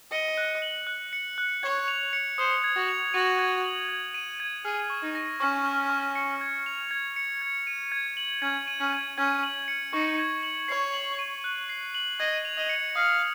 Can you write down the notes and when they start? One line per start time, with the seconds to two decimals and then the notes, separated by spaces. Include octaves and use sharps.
0.11 D#5 C#7
0.38 F#6
0.62 F#7
0.87 F#6
1.13 C#7
1.38 F#6
1.63 C#5 G#6
1.88 F7
2.13 C#7
2.38 C5 D#6
2.64 G#6
2.76 F#4
2.88 F7
3.14 F#4 D#7
3.39 G#6
3.64 F#7
3.89 G#6
4.14 D#7
4.40 G#6
4.65 G#4 F6
4.90 C#6
5.02 D#4
5.15 A#6
5.40 C#4 C#6
5.66 F6
5.90 C#6
6.16 C#7
6.41 G#6
6.66 F7
6.91 G#6
7.16 C#7
7.41 G#6
7.67 D#7
7.92 G#6
8.17 F#7
8.42 C#4 G#6
8.67 D#7
8.80 C#4
8.93 G#6
9.18 C#4 G#6
9.43 F#7
9.68 C#7
9.93 D#4 C#6
10.19 G#6
10.43 F#7
10.68 C#5 C7
10.94 F#7
11.19 D#7
11.44 F#6
11.69 C7
11.94 F#7
12.20 D#5 G#6
12.45 F7
12.57 D#5
12.69 C#7
12.95 F5 D#6